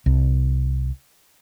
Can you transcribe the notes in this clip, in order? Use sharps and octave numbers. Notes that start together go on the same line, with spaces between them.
C2